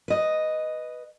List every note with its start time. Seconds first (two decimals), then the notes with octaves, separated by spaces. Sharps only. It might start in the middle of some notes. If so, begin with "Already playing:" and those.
0.08 B4 D#5